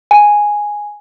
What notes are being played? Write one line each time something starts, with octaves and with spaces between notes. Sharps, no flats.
G#5